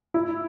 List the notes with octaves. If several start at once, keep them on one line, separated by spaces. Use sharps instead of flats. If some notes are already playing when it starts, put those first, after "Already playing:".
E4